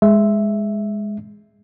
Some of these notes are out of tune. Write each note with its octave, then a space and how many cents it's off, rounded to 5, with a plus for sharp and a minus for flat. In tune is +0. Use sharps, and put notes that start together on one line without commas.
G#3 +0 E5 +0